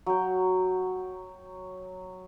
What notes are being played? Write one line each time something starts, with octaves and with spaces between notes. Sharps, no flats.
F#3 G5